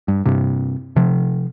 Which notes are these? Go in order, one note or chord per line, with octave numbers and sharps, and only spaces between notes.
G2
G2 C3
C3 F3